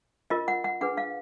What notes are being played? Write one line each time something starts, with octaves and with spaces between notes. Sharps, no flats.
F4 A#4 D#5
F#5
F#5
D4 G#4 B4 F#5
F5